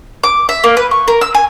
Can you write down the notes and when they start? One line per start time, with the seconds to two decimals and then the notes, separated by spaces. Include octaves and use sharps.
0.23 D6
0.49 E5
0.64 A#3
0.77 B4
0.91 C#6
1.08 A#4
1.21 E6
1.35 G#5